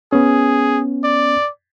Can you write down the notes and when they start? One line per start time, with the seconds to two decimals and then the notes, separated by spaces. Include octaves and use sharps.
0.13 B3 C#4 G#4
1.04 D5